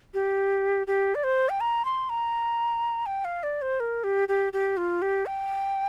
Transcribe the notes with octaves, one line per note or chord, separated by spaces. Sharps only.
G4
G4
D5
C5
G5
A#5
C6
A#5
G5
F5
D5
C5
A#4
G4
G4
G4
F4
G4
G5